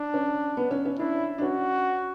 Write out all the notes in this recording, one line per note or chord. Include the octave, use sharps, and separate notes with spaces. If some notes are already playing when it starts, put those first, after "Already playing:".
Already playing: D4
C#4
B3
C#4
C#4
D4 E4
D4
C#4 F#4